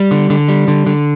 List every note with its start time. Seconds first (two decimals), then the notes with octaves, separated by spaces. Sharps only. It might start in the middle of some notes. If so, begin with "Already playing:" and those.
Already playing: G3
0.11 D3
0.30 D3
0.49 G3
0.68 D3
0.86 D3